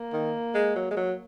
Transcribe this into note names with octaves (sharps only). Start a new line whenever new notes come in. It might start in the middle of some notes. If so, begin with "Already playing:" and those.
Already playing: A#3
D#3
G#3
F#3
G#3
F#3